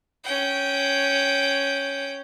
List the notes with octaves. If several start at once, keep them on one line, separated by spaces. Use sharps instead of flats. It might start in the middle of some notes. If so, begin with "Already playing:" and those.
C#4 G5